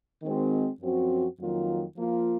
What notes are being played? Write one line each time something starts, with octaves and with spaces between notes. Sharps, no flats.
D#3 G#3 C4 F#4
F#2 F3 C4 F#4
F2 D#3 F#3 A#3 F4
F3 A#3 F4